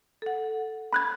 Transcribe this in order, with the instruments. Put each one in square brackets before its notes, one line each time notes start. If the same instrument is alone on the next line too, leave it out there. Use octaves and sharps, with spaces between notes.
[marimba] A4 F#5
[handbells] B5 F#6 G#6